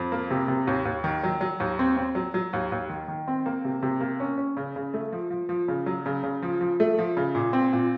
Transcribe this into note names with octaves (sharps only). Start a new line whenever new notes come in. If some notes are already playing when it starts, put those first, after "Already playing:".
Already playing: F2
A#3
C3
C3
D#2
D#2
D#3
F#3
F#3
D#2
C4
C4
F#3
F#3
D#2
D#2
D#3
D#3
C4
A#3
C3
C3
A#3
C#4
C#4
C#3
C#3
A3
F3
F3
F3
C#3
F#3
C#3
C#3
F3
F3
A3
F3
C#3
A#2
C4
A#2